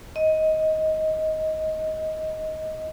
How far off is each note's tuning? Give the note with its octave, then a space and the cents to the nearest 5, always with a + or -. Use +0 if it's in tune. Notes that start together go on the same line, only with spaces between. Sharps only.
D#5 +15